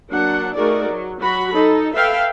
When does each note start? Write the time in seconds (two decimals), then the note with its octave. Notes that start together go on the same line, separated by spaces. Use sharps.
0.11 F#3 A#3 D4 F#5
0.54 A3 D#4 F#4 G#4 A#4 D5
0.88 F#3
1.19 F#3 F#4 B5
1.52 D#4 A4
1.93 A4 B4 E5 F5 G5